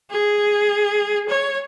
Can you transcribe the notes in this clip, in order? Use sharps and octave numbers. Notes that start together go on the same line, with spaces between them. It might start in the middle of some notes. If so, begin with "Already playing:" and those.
G#4
C#5